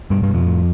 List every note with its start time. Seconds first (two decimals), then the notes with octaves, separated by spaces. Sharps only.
0.10 G2 B2 G3
0.22 G2 G3
0.28 B2
0.34 F2 F3
0.46 A2